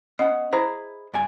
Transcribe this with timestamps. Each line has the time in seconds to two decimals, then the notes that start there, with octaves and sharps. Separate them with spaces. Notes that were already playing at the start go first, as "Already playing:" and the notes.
0.19 B3 C#4 D#5 F#5
0.53 E4 G#4 C5 A#5
1.14 G2 D5 G#5